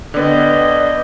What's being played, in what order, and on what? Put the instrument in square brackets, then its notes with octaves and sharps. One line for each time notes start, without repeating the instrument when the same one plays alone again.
[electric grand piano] D3 B3 [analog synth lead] D5 [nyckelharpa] D#5 G5